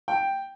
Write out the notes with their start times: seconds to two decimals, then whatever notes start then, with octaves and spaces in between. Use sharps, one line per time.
0.08 G5